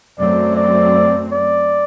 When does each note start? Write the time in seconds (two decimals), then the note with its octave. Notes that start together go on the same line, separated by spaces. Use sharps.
0.19 F#2 F#3 A3 C4 D5
0.57 D5
1.32 D5